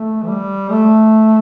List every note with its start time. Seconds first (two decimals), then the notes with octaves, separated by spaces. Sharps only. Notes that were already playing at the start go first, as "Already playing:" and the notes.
Already playing: A3
0.23 E3
0.28 G3
0.71 A3